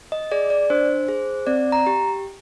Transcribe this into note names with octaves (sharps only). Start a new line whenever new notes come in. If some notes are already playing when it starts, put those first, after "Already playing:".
D#5
G#4 D5
D5
D4 C5
G#4
C4 D5
A#5
G4